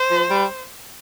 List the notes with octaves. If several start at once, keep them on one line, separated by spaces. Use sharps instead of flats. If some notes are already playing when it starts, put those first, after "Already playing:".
Already playing: C5
F3
G3